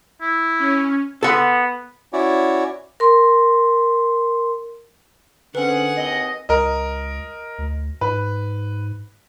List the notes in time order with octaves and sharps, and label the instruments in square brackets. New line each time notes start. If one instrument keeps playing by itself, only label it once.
[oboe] E4
[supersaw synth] C#4
[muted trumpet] B3 [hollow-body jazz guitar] A4 F#5
[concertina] C#4 E4 F#4 C#5 D5
[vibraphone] A#4 C6
[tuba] D3 [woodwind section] C4 C#4 [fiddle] G#4 F#5 [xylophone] B4
[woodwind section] D#2 C4 D#5
[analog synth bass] C#2 [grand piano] A#4 D#5
[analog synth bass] D2
[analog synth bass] G#2 [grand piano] B4